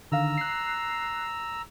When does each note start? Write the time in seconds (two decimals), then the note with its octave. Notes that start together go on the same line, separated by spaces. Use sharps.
0.12 D3 D#3 F5 A#5 E6
0.38 F#6 C7